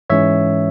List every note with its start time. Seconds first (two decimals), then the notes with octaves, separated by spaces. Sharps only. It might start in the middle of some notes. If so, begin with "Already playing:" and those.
0.10 G#2 E3 G#3 C#4 C#5 E5